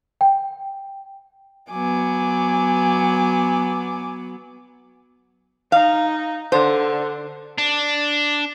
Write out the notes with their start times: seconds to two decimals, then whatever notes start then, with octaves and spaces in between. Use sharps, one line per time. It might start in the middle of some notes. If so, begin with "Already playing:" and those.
0.21 G5
1.72 F#3 B3 G#5 D6
5.72 D#4 F5
6.52 D3 C5
7.58 D4